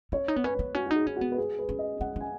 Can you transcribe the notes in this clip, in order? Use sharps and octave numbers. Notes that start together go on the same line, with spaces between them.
C#4 C#5
D#4
B3
C#4 B4
B3
C#4 F#4
F#4
D#4 G#4
C#4
B3 F#4
B4
G#4
B4
C#4
D#5
C#4 F#5
C#4
G#5